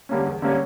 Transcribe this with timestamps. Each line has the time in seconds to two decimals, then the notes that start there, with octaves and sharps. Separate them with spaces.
0.09 D3 G3 A#3 C#4
0.26 E2
0.42 D3 G3 A#3 C#4